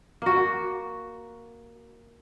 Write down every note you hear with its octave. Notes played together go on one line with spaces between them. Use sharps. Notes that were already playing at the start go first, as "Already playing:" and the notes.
A#3 F#4